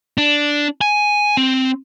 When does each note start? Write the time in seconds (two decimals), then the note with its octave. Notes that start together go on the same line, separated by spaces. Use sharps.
0.18 D4
0.81 G#5
1.37 C4